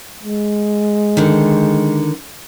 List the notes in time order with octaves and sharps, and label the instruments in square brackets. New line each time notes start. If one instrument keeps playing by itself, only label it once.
[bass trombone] G#3
[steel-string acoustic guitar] D3 D#3